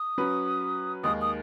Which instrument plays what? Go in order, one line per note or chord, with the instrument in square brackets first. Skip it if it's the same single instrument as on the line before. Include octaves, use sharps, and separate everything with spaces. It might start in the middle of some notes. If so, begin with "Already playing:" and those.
Already playing: [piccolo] D#6
[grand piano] F#3 C#4 B4
[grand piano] D#2 D#3 G#3 [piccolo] D#6
[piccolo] D#6